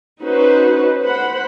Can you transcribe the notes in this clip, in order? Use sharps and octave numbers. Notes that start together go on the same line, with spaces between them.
C#4 D#4 F#4 B4 C5
C5 F#5 B5